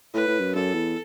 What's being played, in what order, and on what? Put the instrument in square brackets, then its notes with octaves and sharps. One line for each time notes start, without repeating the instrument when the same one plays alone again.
[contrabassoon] A2 [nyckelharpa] B4
[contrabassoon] A2
F#2
[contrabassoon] F#2 [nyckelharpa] A4
[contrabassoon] E2